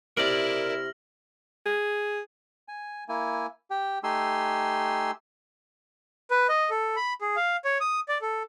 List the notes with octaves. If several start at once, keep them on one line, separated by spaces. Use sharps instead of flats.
C3 E4 A#4 D5 F6 A#6 F#7
G#4
G#5
A#3 E4 G#5
G4 G5
A3 D#4 G4 G#5 C6 E6
B4
D#5
A4
B5
G#4
F5
C#5
D#6
D5
A4